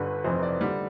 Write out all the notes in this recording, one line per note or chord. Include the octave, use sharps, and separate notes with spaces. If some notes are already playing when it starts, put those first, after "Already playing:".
Already playing: G1 G2 D3 B4
F1 F2 E3 C5
D5
D3 G3